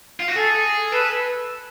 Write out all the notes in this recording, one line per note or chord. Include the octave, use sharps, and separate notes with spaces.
F4
F#4
G#4 A4
A4 B4